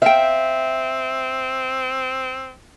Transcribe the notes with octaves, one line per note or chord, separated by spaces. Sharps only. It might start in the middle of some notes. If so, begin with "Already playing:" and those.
C4 E5 F5 G5